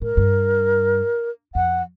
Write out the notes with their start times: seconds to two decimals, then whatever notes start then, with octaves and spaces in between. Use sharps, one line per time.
0.02 A2 A#4
0.17 G2
1.55 F2 F#5